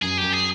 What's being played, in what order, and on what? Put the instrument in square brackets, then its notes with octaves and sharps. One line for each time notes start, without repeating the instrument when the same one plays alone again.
[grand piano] F#2 [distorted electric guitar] G#4
[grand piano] F#2 [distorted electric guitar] G4
[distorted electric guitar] G#4